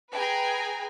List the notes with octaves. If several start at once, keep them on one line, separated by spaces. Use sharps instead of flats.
G#4 B4 G5 G#5 A#5